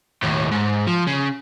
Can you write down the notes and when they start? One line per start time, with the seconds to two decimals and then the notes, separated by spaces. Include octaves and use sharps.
0.23 D#2 A2
0.51 G#2
0.87 F3
1.07 C#3